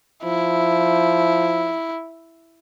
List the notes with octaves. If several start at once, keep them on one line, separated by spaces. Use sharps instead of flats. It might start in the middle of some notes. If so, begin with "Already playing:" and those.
F3 E4